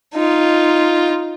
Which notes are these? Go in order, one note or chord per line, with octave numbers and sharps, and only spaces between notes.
D#4 F4